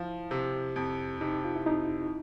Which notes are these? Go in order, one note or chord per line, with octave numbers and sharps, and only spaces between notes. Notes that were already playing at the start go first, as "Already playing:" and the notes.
Already playing: F3 E4
C3
F2
C3 D#4
F4
E4
F2 D#4